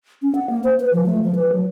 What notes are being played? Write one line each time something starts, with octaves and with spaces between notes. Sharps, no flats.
C#4
F#5
A#3
C5
B4
F3
A3
F3
B4
F#3